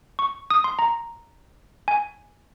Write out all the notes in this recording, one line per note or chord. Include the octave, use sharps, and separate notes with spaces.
C#6
D#6
C6
A#5
G#5